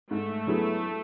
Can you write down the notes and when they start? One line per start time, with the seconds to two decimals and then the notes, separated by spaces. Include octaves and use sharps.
0.11 G#2 A3
0.47 F#3 B3 E4 G#4